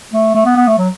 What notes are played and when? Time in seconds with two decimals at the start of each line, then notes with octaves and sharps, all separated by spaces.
0.13 A3
0.35 A3
0.46 B3
0.56 B3
0.67 A3
0.78 F#3